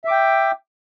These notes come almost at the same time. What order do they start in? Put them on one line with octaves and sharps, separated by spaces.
E5 D6 G5